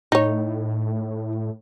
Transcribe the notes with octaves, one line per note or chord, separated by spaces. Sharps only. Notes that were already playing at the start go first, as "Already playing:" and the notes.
A2 D#4 C#5